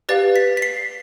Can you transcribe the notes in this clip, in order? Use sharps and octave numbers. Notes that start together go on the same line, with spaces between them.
G4 B4 D5 F5 A6
B6
B6
C7